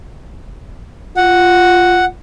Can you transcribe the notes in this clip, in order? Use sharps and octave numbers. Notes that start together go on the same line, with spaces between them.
F4 F#5